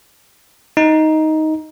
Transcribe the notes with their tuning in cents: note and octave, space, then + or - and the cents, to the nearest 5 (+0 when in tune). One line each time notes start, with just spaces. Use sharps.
D#4 +10